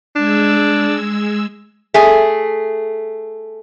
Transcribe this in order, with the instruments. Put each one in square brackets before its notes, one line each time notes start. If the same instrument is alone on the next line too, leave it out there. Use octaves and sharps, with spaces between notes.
[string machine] G#3 E6 G#6 [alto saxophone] D4
[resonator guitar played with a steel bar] A3 G#4